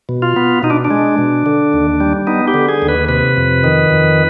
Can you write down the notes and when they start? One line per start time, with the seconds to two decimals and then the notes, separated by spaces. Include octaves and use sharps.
0.09 B2
0.22 F4
0.36 B3
0.63 B2 D#4
0.70 D4
0.85 D4
0.91 G#3
1.18 B2
1.46 D3
1.73 D#2
2.00 G3
2.27 B3 D#4
2.48 G4
2.54 D3
2.69 G#4
2.82 D#2
2.88 B4
3.09 C3 B4
3.37 F2
3.64 D#3
3.90 F2